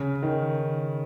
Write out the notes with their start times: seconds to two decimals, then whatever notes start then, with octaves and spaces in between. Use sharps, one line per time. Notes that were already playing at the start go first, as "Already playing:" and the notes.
Already playing: C#3
0.22 D#3